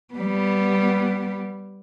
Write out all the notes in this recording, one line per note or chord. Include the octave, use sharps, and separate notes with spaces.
G3 B3